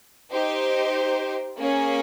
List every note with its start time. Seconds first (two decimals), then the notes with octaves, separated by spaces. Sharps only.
0.31 D#4 G4 C5
1.57 A#3 C#4 G#4